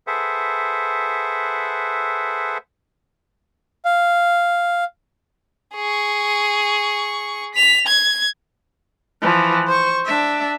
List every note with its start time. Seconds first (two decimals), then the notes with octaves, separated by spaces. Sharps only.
0.07 G#4 A4 B4 C5 E5 F#5
3.85 F5
5.76 G#4 C#6
7.55 B6 F7
7.87 G#6
9.21 E3 F3
9.67 C5 C#6
10.05 D4 E5